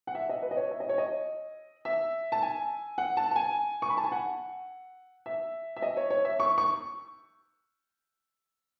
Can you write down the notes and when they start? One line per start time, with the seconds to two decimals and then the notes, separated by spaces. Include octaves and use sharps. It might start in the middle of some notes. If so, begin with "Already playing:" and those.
0.07 F#5
0.15 E5
0.29 D#5
0.42 B4
0.51 D#5
0.57 C#5
0.71 E5
0.80 D#5
0.89 C#5
0.98 D#5
1.85 E5
2.32 A5
2.42 G#5
2.98 F#5
3.17 A5
3.31 A5
3.36 G#5
3.82 C#6
3.89 B5
3.97 A5
4.04 G#5
4.12 F#5
5.26 E5
5.76 E5
5.82 D#5
5.97 C#5
6.10 C#5
6.25 E5
6.40 C#6
6.58 C#6